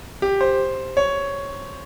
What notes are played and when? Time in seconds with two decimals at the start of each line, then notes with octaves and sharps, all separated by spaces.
0.22 G4
0.41 C5
0.97 C#5